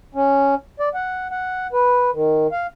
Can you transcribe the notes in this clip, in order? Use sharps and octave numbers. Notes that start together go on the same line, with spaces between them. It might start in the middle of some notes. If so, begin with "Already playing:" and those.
C#4
D5
F#5
F#5
B4
D#3
F5